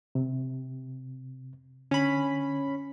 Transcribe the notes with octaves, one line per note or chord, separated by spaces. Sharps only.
C3
D3 C#4 B5